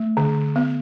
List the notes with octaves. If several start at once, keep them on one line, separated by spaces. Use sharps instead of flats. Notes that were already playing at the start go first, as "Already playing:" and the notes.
Already playing: A3
D3
B3